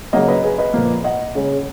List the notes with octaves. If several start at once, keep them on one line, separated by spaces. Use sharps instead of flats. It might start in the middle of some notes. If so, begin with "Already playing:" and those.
C#3 F#3 A#3 D#5 F#5
B4 D#5
G#4 B4
B4 D#5
A#2 F3 A#3
D#5 F#5
C#3 G#3 C#4